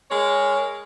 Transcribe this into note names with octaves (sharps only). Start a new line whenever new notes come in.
G#3 A#4 C#5